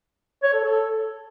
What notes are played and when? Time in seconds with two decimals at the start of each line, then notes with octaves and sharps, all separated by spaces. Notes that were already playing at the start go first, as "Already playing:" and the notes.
0.43 C#5
0.54 A4
0.64 A4